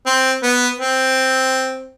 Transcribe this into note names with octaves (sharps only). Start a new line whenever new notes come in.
C4
B3
C4